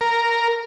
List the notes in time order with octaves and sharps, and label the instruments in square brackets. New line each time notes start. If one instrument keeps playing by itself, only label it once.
[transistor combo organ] A#4